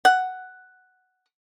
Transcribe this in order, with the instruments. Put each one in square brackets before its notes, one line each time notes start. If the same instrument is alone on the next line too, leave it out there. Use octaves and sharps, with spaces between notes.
[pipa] F#5